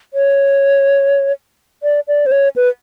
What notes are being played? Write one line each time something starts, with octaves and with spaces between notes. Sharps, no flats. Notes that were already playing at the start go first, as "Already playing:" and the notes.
C#5
D5
D5
C5
C#5
B4